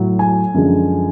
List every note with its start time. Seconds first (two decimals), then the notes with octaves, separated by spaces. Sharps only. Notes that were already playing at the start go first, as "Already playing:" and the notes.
Already playing: A2 F#3
0.19 G#5
0.54 F#2 D3 F3 G#3